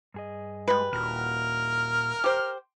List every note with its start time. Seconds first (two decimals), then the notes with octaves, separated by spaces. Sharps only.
0.14 G2 G#4 D#5
0.68 G3 G#3 B4
0.93 D#1 A#2 E4 F#4 A#4 F6
2.24 G4 C5